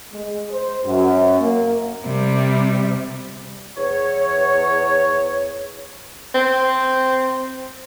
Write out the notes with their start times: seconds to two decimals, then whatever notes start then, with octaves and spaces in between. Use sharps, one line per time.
0.13 G#3
0.51 C5
0.84 F#2
1.39 A#3
2.05 C3 G3
3.77 E2 C#5
6.35 C4